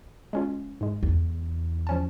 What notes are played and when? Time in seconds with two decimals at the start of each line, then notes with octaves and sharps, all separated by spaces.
0.33 G#3 C#4 F4
0.81 G#2 G#3
1.03 E2
1.87 F3 C#4 A5